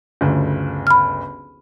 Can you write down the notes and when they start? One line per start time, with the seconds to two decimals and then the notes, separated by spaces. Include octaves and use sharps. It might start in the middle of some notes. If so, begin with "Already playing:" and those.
0.21 G1 D2 C#3
0.87 B5 F6